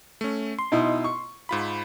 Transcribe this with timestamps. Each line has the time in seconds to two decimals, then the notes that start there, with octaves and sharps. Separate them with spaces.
0.21 A3 C#4
0.59 C6
0.72 B2 D#4 E4
1.04 C#6
1.49 G#2 F4 B5